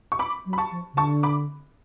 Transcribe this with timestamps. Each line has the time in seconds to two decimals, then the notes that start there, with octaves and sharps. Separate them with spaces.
0.12 C#6
0.19 B5 D6
0.45 F#3
0.53 B5
0.58 A5 C#6
0.71 F3
0.93 C#3
0.97 D3 A5 C#6
1.23 B5 D6